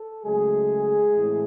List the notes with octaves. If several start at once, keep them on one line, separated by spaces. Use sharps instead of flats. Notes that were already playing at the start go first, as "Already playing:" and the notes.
Already playing: A4
C#3 F#3 G#3 A3 G#4
A2 E3 C4